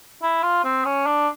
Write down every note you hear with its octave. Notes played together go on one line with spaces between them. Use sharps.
E4
F4
C4
C#4
D4